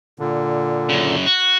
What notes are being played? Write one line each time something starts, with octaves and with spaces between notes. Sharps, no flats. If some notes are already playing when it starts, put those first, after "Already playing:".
A#2 D3
F#2 C#3
F#4